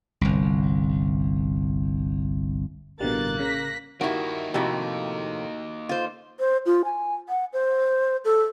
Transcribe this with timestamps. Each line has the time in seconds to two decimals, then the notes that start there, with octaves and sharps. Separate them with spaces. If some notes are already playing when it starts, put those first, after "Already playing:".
0.21 G1 C2
3.00 A1 B2 D3 G3 A#3 F#6 A6
3.39 C#3 A#6 B6
4.01 G2 D#3 A#3 D#4 E4 F#4
4.54 F2 A2 C3 E4 F#4 G4
5.89 F4 C5
6.40 C5
6.66 F4
6.85 G#5
7.29 F#5
7.53 C5
8.25 A4